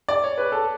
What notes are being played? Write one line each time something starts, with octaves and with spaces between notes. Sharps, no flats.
D5
C#5
B4
A4